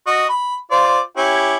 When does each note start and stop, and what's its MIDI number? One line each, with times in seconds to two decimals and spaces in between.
0.07 0.24 66
0.07 0.24 75
0.29 0.55 83
0.71 1.00 65
0.71 1.00 72
0.71 1.00 74
1.17 1.57 61
1.17 1.57 64
1.17 1.57 67